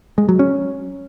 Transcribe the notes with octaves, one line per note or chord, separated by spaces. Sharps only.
G#3
F#3
C#4